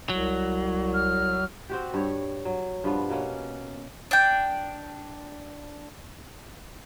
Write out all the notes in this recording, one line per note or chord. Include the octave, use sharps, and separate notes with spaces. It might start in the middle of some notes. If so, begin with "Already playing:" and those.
C2 F#3
F6
C4 F#4 G4
G2 C#5
F#3
G2 F3 B3
B2 A#3 C#4 F#5
D4 G5